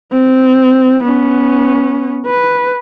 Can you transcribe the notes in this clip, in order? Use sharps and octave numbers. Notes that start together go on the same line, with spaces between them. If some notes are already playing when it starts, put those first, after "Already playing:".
C4
B3 C#4
B4